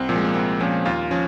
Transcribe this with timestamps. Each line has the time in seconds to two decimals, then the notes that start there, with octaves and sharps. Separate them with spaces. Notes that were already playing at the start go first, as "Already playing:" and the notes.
Already playing: C2 C4
0.09 A#2 F3
0.16 G#3
0.25 A#3
0.34 C2 C4
0.60 A#2 F3 C#4
0.85 D#2 F4
1.11 F3 C#4